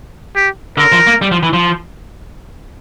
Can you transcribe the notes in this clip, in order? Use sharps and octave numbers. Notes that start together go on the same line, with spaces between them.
G4
D3 A#4
F3
A#3
G3
F3
E3
F3